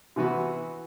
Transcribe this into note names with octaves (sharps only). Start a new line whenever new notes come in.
C3 E3 B3 F#4